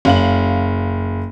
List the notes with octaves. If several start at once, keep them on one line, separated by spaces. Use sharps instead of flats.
F#1 F5 F#7